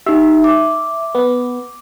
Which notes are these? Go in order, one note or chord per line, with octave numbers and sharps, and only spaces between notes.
D#4 G4 E5
D6
B3